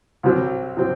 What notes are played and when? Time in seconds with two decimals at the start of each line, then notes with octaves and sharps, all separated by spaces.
0.23 C2 C3 F#3 C4
0.77 C3 F#3 C4